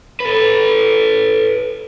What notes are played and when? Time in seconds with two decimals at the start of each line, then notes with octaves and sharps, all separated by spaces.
0.20 A4 B4